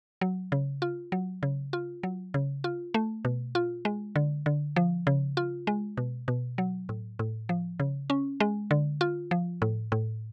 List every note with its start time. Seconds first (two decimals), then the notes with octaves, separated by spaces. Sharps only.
0.21 F#3
0.52 C#3
0.82 F4
1.12 F#3
1.43 C#3
1.73 F4
2.03 F#3
2.34 C#3
2.64 F4
2.94 A3
3.25 B2
3.55 F4
3.85 G#3
4.16 D3
4.46 D3
4.76 F3
5.07 C#3
5.37 F4
5.67 G#3
5.97 B2
6.28 B2
6.58 F#3
6.89 A2
7.19 A2
7.49 F3
7.80 C#3
8.10 C#4
8.40 G#3
8.71 D3
9.01 F4
9.31 F3
9.62 A2
9.92 A2